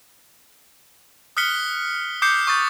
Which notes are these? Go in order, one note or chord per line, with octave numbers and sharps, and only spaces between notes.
D#6 F6 F#6 B6 C#7 G7
D6 D#6 G6 C7 C#7
C#6 D#6 G6 A6